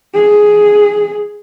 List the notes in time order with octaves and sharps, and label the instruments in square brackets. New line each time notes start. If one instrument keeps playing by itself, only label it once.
[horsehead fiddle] G#4